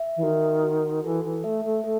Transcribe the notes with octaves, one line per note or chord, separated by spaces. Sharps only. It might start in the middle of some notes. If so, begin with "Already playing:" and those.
Already playing: E5
E3
D#3 F#4
F#4
E3 A4
E3
A3 E5
A3
A3 A4